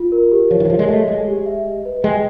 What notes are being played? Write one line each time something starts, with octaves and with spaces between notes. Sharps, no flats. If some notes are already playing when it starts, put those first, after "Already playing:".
Already playing: F4
A#4
G4
F3 C#5
E3
F#3
F3 C#5
G#3
A3 D#5
G#3 G#4
G4
E5
D#5
B4
G#3 G5